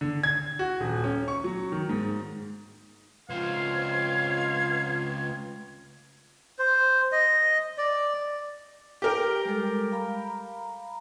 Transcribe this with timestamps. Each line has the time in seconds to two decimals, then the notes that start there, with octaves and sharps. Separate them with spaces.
0.01 D3
0.23 G#6
0.59 F#4
0.80 D#1
1.04 C#4
1.28 C#6
1.44 F#3
1.72 D#3
1.89 G#2
3.30 C#2 B3 C4 F4 C5 F5 G#6
6.59 C5
7.12 D#5
7.78 D5
9.02 G4 A#4 G5
9.45 G3 G#3 A4
9.92 F5 A#5 B5